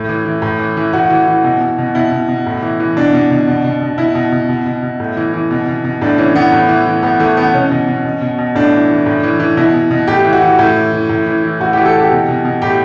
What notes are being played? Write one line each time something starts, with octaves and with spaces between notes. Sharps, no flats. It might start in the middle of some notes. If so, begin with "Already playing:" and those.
Already playing: A2
E3
E3
A2
E3
E3
A2 F#4
E3
E3
B2
B2
B2
B2 E4
B2
B2
A2
E3
E3
B2 D4
B2
B2
B2
B2
B2
B2 E4
B2
B2
B2
B2
B2
A2
E3
E3
B2
B2
B2
A2 D4
E3 C#4
E3 B3
A2
E3
E3
A2 B3
E3 A3
E3 B3
B2 C#4
B2
B2
B2
B2
B2
A2 D4
E3
E3
A2
E3
E3
B2 E4
B2
B2
A2 G4
E3
F#4
E3
A2 E4
E3
E3
A2
E3
E3
A2 F#4
E3 G4
A4
E3 G4
B2
B2
B2
A2 G4